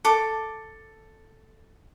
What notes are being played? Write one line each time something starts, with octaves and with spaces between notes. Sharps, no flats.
A4 D6